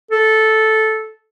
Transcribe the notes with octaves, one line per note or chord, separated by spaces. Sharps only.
A4